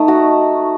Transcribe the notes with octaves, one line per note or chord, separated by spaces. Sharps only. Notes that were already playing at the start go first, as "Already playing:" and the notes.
Already playing: A3 D#4
F#4